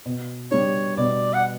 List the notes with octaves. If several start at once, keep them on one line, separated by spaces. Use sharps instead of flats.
B2
G3 D4 C#5
B2 D5
F#5